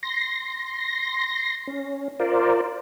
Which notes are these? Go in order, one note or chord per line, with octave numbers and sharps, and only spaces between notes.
C6 A#6
C#4
F4 A#4 C5 D5